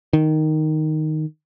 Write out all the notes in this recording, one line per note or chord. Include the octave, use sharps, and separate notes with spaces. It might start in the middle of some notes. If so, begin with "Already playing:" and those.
D#3